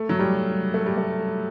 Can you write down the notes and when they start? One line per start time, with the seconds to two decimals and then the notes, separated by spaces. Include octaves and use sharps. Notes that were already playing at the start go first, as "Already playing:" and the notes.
Already playing: A3
0.09 F#3
0.19 G3
0.74 A3
0.86 G3
0.97 A3